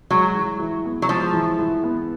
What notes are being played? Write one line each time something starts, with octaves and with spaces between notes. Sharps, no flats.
F#3 G#3
E3
E3
B3
F#3
F3 G#3
E3
E3
B3